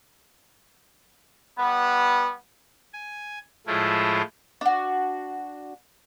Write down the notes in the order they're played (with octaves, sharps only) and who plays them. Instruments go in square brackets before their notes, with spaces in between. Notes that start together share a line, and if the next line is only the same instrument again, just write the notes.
[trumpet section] G3 B3
[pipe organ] G#5
A2 F3 G#3 A3 E4 F4
[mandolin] D4 F#4